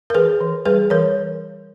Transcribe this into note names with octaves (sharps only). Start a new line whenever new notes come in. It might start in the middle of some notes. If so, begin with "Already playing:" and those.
A#4
E3 G#4 B4
E3
G3 G#4 B4
E3 A#4 C#5